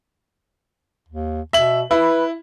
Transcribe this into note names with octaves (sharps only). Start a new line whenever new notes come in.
D#2
B2 E5 F#7
E4 B4